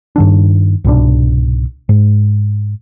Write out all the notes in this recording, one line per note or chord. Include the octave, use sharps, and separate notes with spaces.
G2 D#3 D4
C2 G#2 B2 D4
G#2